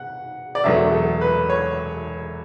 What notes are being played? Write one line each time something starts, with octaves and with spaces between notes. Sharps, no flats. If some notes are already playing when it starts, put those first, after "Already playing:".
Already playing: F#5
D5
E1 E2 D3 F#3 A3 E5
A4
B4
C#5